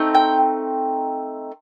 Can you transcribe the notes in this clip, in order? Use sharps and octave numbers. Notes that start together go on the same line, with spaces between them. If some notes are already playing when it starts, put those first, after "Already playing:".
Already playing: A3 C4 D#4
G5